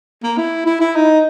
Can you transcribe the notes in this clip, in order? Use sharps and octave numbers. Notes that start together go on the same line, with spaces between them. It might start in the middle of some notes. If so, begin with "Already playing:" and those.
A#3
E4
E4
E4
D#4